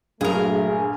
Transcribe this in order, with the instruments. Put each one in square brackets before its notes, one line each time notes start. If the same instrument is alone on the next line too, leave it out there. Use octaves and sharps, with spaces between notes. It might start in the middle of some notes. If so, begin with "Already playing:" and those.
[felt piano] A#1 G2 [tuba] F#3 [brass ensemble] A3 [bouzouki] G#4 A#4